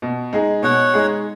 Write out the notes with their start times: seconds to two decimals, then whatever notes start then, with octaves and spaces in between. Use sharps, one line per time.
0.02 B2
0.33 G#3 D#4 G#4
0.63 B2 C#5 F#5
0.94 G#3 D#4 G#4